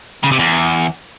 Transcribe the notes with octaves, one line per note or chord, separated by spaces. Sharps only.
C#3
C3
E2